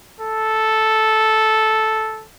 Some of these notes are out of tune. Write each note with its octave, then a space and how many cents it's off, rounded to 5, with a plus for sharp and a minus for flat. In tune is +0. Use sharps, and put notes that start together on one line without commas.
A4 -5